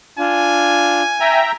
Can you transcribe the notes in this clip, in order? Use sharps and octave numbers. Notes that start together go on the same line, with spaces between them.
D4 F4 G#5
E5 G5 A#5